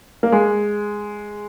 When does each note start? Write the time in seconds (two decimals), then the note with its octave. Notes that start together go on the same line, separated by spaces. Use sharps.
0.23 A#3
0.32 G#3